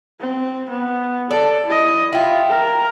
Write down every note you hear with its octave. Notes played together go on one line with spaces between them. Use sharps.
C4
B3
A4 D5
E4 D#5
E4 F4 G4
A#4